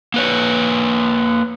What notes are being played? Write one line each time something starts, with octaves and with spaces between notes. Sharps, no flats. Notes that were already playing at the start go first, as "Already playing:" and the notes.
A#3 B4 C#5